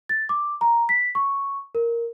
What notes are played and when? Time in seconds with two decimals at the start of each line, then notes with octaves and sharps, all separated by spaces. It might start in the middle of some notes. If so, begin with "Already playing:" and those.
0.09 A6
0.29 D6
0.61 A#5
0.89 B6
1.15 C#6
1.75 A#4